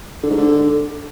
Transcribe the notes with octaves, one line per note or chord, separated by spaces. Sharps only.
D3
G#2
D3